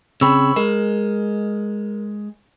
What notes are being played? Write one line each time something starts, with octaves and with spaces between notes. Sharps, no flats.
C#3 C4 B5 C#6 E6
G#3 A#4